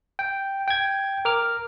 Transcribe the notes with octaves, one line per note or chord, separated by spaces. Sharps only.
G5
G5 G#6
A#4 D6 F6